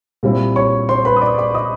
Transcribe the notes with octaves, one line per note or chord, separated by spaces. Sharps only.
A#2 G3 C4 E4
C#5 C#6
C5 C6
B4 B5
D#6
D5 D6
D5 D6
D#5 D#6